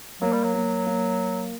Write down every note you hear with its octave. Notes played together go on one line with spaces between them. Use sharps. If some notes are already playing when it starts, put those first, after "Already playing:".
F#3 A#3
G3
F#3
A#3
A#3